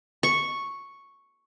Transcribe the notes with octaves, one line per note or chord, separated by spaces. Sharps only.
C#6